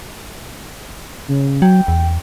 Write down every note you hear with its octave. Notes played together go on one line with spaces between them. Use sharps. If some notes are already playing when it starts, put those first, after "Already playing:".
C#3
F#3 G5
E2